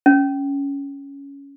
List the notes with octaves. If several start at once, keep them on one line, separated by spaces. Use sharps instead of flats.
C#4